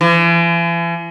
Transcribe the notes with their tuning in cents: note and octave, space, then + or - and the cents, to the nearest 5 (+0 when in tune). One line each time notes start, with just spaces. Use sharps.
E3 +45